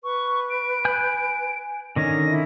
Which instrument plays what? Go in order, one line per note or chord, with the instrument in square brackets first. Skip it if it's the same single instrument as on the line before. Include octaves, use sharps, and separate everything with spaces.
[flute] B4 [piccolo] C#6
[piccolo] D7
[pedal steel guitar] G#5 F#6 G6
[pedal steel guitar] D3 D#3 C#4 [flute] D#5 [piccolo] A#6
[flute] E4